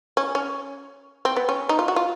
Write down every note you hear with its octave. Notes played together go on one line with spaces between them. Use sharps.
C#4
C#4
C4
B3
C#4
D#4
F4
F#4
F4